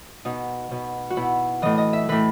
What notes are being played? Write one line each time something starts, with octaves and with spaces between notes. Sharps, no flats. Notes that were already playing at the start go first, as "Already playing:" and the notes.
B2 D#4
B2
F#4
B2 E4
A2 E3 D#5
D#5
E5
A2 E3 B4